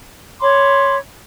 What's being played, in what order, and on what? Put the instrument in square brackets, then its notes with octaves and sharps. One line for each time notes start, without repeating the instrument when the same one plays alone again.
[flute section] C#5 B5 C6 D6